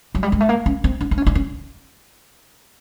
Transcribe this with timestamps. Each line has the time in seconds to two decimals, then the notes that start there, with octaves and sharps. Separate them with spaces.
0.15 F#3
0.23 G3
0.32 G#3
0.40 A3
0.49 A#3
0.66 C#4
0.84 C4
1.00 D4
1.11 D4
1.18 C#4
1.27 D4
1.35 C#4